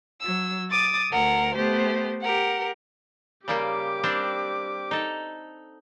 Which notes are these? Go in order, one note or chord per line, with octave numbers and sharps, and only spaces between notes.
F#3 E6
D6 D#6 A6
D2 A#4 F#5
A3 B3 G4 C5
G4 A#4 F#5
C#3 G3 A#3 G4 D6
G3 C4 D4
D#4 A4